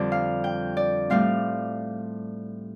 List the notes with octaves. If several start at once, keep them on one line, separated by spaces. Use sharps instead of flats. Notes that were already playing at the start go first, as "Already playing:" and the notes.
Already playing: F2 D3 G3 C4 D5
F5
G5
D5
A2 G3 C4 F5